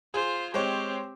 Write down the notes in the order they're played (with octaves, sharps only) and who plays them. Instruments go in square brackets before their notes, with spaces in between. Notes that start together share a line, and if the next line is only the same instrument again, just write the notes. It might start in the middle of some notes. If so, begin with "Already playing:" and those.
[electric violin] F4 C5 [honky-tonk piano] G#4
[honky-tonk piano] G#3 C5 C#5 [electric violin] C4 G4